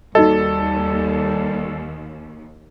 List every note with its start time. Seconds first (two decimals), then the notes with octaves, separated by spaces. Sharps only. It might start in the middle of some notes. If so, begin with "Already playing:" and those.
0.15 D#2 G3 D#4 F#4 A4 D#5